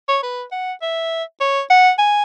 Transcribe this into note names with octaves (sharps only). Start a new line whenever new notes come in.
C#5
B4
F#5
E5
C#5
F#5
G#5